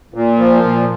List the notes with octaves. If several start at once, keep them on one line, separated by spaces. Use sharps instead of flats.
A#2
F3
A#2